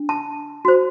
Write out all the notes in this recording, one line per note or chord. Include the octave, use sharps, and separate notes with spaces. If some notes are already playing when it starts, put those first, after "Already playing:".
Already playing: D4
A5
F#4 C5